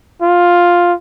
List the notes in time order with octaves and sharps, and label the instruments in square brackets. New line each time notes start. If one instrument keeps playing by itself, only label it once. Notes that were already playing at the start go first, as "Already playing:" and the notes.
[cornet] F4